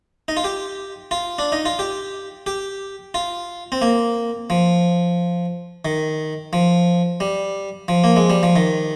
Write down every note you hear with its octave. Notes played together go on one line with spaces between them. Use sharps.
D#4
F4
G4
F4
D4
D#4
F4
G4
G4
F4
C4
A#3
F3
D#3
F3
G3
F3
A#3
G#3
G3
F3
D#3